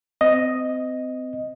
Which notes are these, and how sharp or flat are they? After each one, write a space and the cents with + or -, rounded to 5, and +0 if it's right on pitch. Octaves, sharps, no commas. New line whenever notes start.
C4 -30 D#5 +0